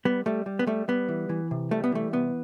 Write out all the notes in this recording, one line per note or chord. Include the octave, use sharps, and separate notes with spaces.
G3 B3
G3 A3
G3
B3
G3 A3
G3 B3
E3
E3
C3
G3 A3
B3
E3 A3
C2 B3